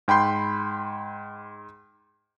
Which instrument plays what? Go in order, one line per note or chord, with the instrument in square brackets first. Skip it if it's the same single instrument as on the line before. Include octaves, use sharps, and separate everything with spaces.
[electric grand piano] G#2 G5 B5 C6 G6